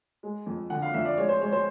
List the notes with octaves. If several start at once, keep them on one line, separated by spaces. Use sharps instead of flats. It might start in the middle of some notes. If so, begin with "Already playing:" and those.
G#3
F2
D3 F#5
F5
F2 E5
D5
G#3 C#5
C5
G#3 C#5
C5